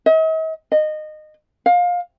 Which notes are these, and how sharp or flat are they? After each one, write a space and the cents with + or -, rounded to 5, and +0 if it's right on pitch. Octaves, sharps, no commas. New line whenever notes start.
D#5 +45
D#5 -20
F5 +25